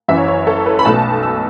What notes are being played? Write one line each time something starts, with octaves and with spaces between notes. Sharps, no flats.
F#1 F#2 E3 E5
C#5
C#5
A4
B4
B5
B1 B2 A3 A5
E6